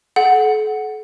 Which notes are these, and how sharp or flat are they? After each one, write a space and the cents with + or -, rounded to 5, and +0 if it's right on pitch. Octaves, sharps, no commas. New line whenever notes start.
A4 -40 F#5 +0